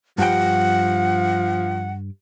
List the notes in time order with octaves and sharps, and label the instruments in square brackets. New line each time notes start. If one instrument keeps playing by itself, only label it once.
[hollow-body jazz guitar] G2 G5 [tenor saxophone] F3 [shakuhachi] F#5